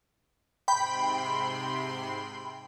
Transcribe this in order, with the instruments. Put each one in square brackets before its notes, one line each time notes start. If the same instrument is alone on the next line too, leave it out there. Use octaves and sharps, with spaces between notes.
[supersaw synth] G#2 C3 C6 [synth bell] G5 B5